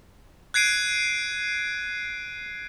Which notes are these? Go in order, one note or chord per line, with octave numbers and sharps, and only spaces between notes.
F#6 G#6 C7 D7 D#7